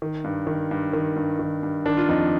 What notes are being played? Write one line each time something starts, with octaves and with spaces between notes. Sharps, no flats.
D#3
G2
D#3
G2
D#3
G2
D#3
G2
D#3 D4
F4
F2 D#4